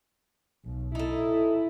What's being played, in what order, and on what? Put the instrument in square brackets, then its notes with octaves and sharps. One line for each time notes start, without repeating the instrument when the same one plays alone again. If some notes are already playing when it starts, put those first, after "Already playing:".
[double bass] B1
[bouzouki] D#4 A4 [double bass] E4